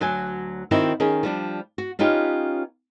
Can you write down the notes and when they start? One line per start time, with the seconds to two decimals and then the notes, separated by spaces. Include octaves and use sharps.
0.01 D2 F#3 G#5
0.71 D#3 C4 D#4 E4 F#4
1.00 D#3 C#4 G#4
1.23 F3 G3 D4
1.78 F#4
1.99 B3 C#4 D#4 F4 G4